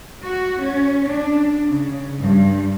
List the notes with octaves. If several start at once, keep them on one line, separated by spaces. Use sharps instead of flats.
F#4
C#4
D4
C#3
G2